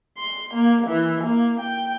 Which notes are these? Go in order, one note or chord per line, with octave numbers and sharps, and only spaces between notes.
C6
A#3
E3
A#3
G5